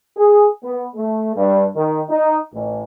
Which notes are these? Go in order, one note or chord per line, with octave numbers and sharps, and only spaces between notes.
G#4
B3
A3
G2
D#3
D#4
A1